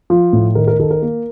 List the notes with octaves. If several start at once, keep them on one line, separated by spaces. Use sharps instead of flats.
F3
A2
D#3 A#4
A#4
D#3 A4
A#4
A#3